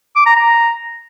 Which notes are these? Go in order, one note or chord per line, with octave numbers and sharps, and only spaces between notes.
D6
A#5
A#5